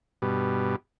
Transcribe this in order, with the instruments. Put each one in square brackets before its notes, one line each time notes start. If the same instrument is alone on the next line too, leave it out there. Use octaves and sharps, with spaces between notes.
[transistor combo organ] G2 B2